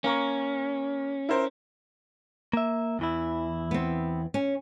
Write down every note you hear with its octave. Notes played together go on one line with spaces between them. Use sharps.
A#3 C#4 A#4 C#6
E4 A#4 C5
A#3 E5
E2 E3 E4
B3 C4
C#4